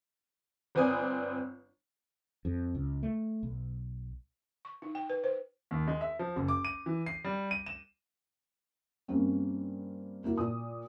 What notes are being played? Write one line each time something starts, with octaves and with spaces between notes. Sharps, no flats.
G1 C4 B4 D5 G#5 D#6
F2
C#2
A3
B1
C#6
D#4
G5
B4
C5
D#2
G#3
E5
F3
F#1
D6
D#7
E3
C7
G3
D#7
E7
G2 G3 A#3 C4 C#4
A#3 E4 F#4
A#2 D#6